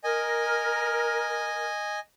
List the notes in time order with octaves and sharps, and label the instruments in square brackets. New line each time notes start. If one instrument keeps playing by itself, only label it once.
[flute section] A#4 [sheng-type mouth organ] D#5 G#5